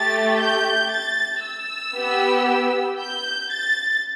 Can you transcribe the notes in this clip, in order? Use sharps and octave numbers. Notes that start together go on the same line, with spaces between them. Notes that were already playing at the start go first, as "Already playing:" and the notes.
Already playing: A3 G4 A6
G6
A6
E6
B3 G4
G6
A6